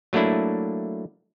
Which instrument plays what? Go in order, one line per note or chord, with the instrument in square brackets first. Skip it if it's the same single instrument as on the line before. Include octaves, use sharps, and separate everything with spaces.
[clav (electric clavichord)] F#3 A3 A#3 D4 E4